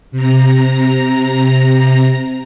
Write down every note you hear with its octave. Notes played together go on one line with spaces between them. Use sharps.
C3 A#5